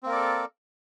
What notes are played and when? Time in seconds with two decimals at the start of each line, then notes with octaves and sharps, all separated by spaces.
0.03 C4
0.06 A#3
0.09 A#4
0.12 D5
0.15 A4